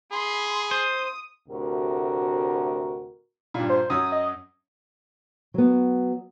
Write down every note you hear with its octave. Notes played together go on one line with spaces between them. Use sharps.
G#4 B5 C6
C5 D#6
D2 A2 C3 F#4 A#4
G2 A#2
C5
F#2 F#3 D#6 E6
D#5
F#3 B3